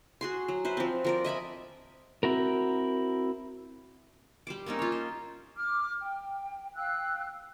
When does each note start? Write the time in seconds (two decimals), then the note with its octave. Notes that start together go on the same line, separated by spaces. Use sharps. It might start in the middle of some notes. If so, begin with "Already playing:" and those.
0.21 F#4 G#4 C6
0.48 F#3
0.65 B4 C5 E5
0.77 F3 C4
1.05 F3 A#4 D5
1.24 D#5 E5 G#5 B5
2.23 C4 E4 F#4 A#4
4.47 G3 C5 D6
4.66 A#3 C4 C#4 D#4
4.79 F4 C#5
4.92 C5
5.55 D6 F6
5.99 G5
6.75 F5 G5 E6 F#6